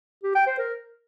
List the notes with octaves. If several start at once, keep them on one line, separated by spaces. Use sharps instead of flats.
G4
G5
C5
A#4